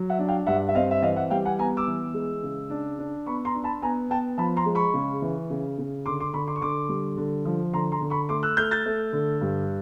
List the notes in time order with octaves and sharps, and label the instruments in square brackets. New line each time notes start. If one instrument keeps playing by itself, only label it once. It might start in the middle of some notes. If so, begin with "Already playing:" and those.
Already playing: [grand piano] F#3
E5 F#5
D4
F5 G5
G2 E5 F#5
E5
C4 D#5 F5
E5
E3 D#5 F5
E5 F#5
G3 F5 G5
F#5 G#5
B3 G#5 A#5
D6 E6
E3
G#3
C#3
D4
D4
B3 B5 C#6
A#5 C6
D4
A5 B5
B3 G#5 A#5
B3 G5 A5
F3 A5 B5
A#5 C6
G#3
B5 C#6
C#3
E3
C#3
C#3
D3 C6 D6
C6 D6
D3 B5 C#6
C6 D6
C#6
D3 C6 D6
G3
D3
F3
D3 A#5 C6
A#5 C6
D3
B5 C#6
A3 C6 D6
E6 F#6
A3 F6 G6
G6 A6
A3
D3
G2